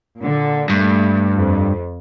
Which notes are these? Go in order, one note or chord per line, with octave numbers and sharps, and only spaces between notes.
A#2 D3
G2 A3
F2